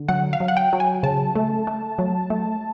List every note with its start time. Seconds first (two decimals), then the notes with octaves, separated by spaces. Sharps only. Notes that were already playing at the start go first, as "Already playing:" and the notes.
Already playing: D3
0.08 F#3 F#5
0.33 F5
0.40 F#3
0.48 F#5
0.57 G5
0.73 F#3
0.80 G#5
1.03 C#3 A5
1.35 A3
1.67 A3
1.98 F#3
2.30 A3